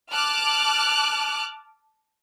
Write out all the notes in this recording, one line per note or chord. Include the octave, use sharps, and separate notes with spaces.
A5 D6 F6 F#6